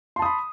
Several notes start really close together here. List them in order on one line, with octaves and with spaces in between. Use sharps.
C6 A5 D#6 B5